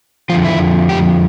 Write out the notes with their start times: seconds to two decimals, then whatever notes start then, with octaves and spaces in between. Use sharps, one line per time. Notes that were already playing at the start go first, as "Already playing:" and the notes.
0.29 F2 D3 F3 F4
0.45 E4
0.89 G4